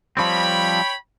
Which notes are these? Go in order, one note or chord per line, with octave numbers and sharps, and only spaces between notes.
F3 G3 C4 C#5 G5 B5